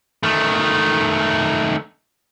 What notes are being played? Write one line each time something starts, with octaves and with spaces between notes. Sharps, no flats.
D#3 A3